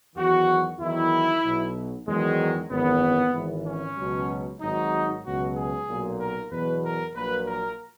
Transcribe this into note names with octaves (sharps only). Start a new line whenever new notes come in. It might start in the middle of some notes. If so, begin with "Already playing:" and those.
E2 D#3 F#3 F#4
E2 D#3 F#3 E4
B1 B2 F#3
E2 D#3 F#3 G#3
G#1 F#2 E3 B3
G#1 G#2 E3
C#4
C#2 B2 F#3
G#1 G#2 F#3 D#4
C#2 B2 F#3 F#4
G#4
B1 A#2 F#3
A#4
E2 B2 F#3 B4
A#4
A#1 A#2 F#3 B4
A#4